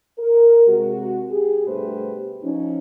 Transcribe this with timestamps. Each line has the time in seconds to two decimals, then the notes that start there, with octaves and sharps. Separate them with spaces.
0.18 A#4
0.67 C3 G#3 F#4
1.30 G4 G#4
1.66 G2 B2 A3 G4 B4 C5
2.43 F3 C#4 D#4